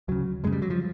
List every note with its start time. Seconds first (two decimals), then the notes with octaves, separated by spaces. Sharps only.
0.08 D2 C#3 F#3
0.44 F#2 C#3 G#3
0.52 G3
0.62 F#3
0.70 F3